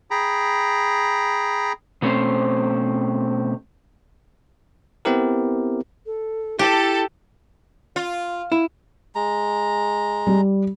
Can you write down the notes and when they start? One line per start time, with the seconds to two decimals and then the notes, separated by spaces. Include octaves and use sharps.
0.11 G#4 G5 A#5 B5
2.02 B2 A3 C4 C#4 C5
5.05 B3 C4 E4 G4 A#4
6.06 A4
6.59 E4 G4 A4
7.96 F4
8.52 E4
9.15 G#3 A#5
10.27 G3